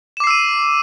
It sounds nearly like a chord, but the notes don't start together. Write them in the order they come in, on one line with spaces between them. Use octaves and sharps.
E7 D6 C7 E6 D#7